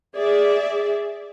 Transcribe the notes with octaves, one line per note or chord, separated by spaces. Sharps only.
G#4 D5 E5